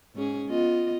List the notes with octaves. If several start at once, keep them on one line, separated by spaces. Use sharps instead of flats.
G#2 C#4 G#4
B3 F4 D#5